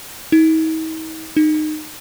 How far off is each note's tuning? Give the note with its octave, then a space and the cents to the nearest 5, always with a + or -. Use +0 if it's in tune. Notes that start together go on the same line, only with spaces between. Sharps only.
D#4 +45
D#4 -20